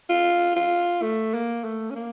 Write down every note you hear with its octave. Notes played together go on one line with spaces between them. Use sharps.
F4
F4
A3
A#3
A3
C#4
A#3